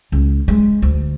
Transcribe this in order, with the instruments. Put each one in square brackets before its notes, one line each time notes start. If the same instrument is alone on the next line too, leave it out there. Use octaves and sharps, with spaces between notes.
[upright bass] C#2
G#3
D2